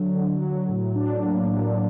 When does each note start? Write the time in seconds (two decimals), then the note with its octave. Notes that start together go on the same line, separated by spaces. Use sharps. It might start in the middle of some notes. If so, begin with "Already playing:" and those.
Already playing: D3 F#3
0.15 D3
0.42 F#3
0.69 A2
0.96 D4
1.23 A#3
1.50 D4